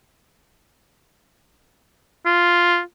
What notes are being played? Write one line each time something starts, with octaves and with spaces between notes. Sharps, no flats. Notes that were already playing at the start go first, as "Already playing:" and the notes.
F4